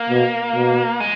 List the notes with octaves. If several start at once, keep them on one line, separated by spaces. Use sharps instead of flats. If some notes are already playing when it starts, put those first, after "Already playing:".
Already playing: A#3
B2
B2
G#3